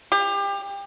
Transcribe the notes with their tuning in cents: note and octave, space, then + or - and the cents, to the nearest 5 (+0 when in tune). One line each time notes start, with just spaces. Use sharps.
G4 +30